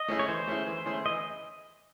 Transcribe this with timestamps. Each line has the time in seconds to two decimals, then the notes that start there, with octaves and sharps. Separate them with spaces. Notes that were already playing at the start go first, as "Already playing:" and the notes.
Already playing: D#5
0.08 A3 C#4 E4 G#4
0.19 C#5
0.28 E3 C5
0.48 A3 C#4 E4 G#4
0.67 E3
0.86 A3 C#4 E4 G#4
1.06 E3 D#5